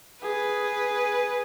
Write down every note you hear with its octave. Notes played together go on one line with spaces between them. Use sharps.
G#4 B4